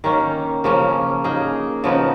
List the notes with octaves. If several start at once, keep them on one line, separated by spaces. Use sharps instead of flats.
D#3 A#3 C#4
C#3 F3 A#3 C#4
A#3 D#4 G#4
C#3 F3 B3 D#4